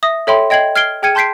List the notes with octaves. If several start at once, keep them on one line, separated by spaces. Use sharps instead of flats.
E5 D#6 A#6
A4 C#5 E5 G5 B5 C6
D#5 G5 G#6 C7 F#7
F6 G#6 C7 D7 G7
G#4 G5 F6 G#6 C#7 D#7
A5 C6 G6 B6 C7 D7